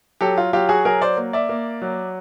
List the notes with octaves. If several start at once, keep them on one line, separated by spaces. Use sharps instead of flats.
F#3 G4 A4
F4
F#3 F4 G4
F#4 G#4
F#3 G#4 A#4
C5 D5
A#3
D5 E5
A#3
F#3